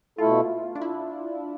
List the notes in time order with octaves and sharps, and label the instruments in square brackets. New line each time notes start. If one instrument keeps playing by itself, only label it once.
[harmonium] B2 A3 E4 A4 [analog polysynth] F4
[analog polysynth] D4
E4